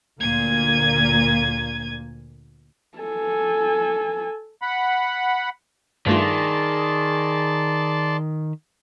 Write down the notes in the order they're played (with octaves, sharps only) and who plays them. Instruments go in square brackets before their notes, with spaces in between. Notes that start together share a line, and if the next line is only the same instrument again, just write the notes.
[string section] D2 A#2 A#3 [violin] G#6 D#7
[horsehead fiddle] A4 G#5
[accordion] F#5 B5
[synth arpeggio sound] G2 A3 F4 [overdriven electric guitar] D#3 [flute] G#4 [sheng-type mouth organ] D5 A5 C6